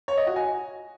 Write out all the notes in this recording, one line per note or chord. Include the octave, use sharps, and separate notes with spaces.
C#5
D#5
F#4
G#5